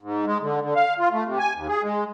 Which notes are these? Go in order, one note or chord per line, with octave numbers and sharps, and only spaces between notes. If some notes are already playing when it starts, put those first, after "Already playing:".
G#2
G#3
D3
D3
F5
F4
A3
C3
G#5
D#2
G#4
G#3